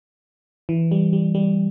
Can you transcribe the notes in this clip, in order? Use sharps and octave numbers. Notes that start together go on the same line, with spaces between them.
E3
G3
G3
G3